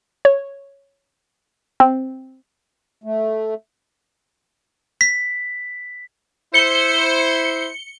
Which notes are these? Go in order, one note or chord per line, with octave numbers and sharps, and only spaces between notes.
C#5
C4
A3
B6
E4 C5 C#7 G7